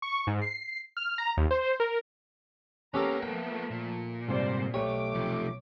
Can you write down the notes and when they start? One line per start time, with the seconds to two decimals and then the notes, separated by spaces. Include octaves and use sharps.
0.02 C#6
0.27 G#2
0.42 C7
0.97 F6
1.18 A#5
1.37 D#2
1.51 C5
1.80 A#4
2.94 A#3 B3 C#4 G4 A4 A#5
3.22 F3 A3 G5
3.71 A#2
4.28 G#2 C3 G3 C5 D5
4.74 B1 A3 G4 C#5 D6
5.14 C3 F3